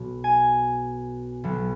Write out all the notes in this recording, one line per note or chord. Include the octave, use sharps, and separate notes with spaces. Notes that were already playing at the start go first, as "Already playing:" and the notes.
Already playing: B1 B2
G#5
B1 B2 F#3